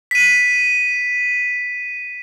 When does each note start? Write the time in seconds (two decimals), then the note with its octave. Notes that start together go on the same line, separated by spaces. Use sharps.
0.11 B6 D#7